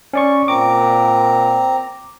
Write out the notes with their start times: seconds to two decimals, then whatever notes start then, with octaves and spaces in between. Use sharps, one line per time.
0.13 C#4 D5 C#6
0.48 A#2 C4 A#5 D6